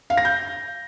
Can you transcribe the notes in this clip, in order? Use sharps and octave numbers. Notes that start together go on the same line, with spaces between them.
F5
A#6
G6